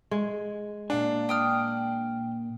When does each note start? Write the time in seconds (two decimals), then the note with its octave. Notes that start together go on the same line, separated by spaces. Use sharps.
0.11 G#3
0.90 A#2 D4 F5 G#5
1.29 G5 D#6 F6